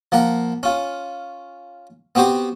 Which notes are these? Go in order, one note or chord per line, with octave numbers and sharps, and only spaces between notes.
F3 A#3 F#5 A#5
C#4 F4
B3 C4 F#4 G4 C5